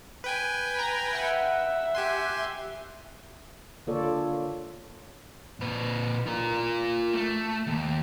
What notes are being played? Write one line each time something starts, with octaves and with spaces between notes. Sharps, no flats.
B4 G5 G#5
A#5
E5 F#5
G4 G#5 C6
D3 A#3 F4 A4 C#5 D5
A#2 B4
F4 A#4
A3
D#2